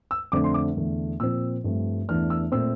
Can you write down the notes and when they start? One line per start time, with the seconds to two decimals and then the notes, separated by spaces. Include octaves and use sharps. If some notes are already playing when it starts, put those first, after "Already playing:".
0.11 E6
0.32 F2 D3 A3 C4 D6
0.44 C6
0.54 D6
0.77 E2 D3 A3
1.20 A#2 F3 C4 E6
1.64 G2 F3 A3 C4
2.08 E2 E3 A3 D4 F6
2.30 E6
2.52 A#2 A3 C4 E6